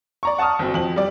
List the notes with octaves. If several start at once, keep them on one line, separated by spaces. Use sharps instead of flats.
D5 A#5 C#6
F#5 A5 C#6 D#6 F6
G1 C4 F#4
F2 F#7
G3 D5